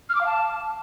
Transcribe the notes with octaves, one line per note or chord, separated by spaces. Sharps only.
F6
D6
F5
A5